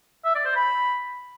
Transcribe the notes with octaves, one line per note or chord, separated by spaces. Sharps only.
E5
D5
C5
B5